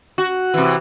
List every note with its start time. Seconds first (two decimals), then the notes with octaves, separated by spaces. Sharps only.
0.18 F#4
0.54 C3 E3